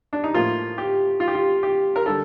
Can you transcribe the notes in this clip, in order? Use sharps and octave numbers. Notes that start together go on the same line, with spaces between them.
D4
D#4
A2 F3 A#3 F4
G4
F4
G4
F4
G4
A#4
D3 G3 A4